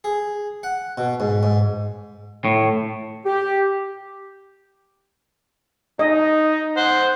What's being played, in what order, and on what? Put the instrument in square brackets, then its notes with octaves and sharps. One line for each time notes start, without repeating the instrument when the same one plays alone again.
[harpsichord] G#4
F#5
B2
G#2
G#2
[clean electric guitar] A2
[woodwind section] G4
[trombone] D#4 [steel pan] D#5
[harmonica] C5 F#5